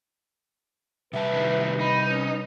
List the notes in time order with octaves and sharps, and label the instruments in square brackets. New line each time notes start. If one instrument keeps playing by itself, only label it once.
[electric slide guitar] C3 G3 A5 [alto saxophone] B4 [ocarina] E5
[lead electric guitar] F2 D#3
[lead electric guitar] D#4 [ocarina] B5
[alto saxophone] C#4 [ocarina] B4